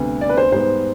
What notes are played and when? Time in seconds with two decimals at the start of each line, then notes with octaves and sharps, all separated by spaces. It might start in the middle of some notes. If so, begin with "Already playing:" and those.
Already playing: D2 C3 G3 B3
0.21 D5
0.29 B4
0.37 C5
0.52 G#2 G3 B3 C5